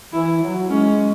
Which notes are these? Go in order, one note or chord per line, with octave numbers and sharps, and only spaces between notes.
E3 E4
F#3
G#3 C#4